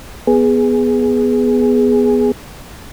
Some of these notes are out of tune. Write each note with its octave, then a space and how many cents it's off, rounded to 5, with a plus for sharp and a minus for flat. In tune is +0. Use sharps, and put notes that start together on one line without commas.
B3 +0 G#4 +0